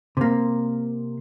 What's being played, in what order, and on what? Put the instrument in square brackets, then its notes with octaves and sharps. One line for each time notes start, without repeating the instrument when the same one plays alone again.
[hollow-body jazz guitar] C3 A#3